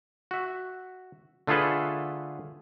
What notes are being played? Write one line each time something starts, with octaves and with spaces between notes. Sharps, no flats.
F#4 E5
D3 A3 F4 G#4 A4 B4